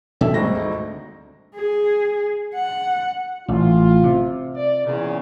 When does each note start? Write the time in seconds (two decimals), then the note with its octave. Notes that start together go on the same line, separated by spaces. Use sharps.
0.21 B2 A4 E5 G5
0.34 G#1 G#2 G3 A3 A#6
0.55 D2
1.55 G#4
2.55 F#5
3.48 A1 F4
4.04 C3
4.56 D5
4.85 E2 A#2 C#3